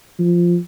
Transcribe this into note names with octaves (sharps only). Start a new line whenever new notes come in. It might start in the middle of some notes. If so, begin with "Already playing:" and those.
F3